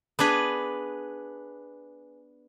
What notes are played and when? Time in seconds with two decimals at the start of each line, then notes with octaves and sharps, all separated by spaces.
0.19 B3 D4 G#4 B4